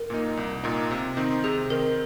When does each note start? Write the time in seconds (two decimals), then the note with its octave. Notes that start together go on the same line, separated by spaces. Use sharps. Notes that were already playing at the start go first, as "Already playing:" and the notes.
Already playing: A#4
0.10 A#2 A#3 D#4
0.37 C2
0.63 A#2 A#3 D#4
0.91 C3
1.17 D#3 C4 D#4
1.44 C3 G#4
1.70 D#3 C4 D#4 A#4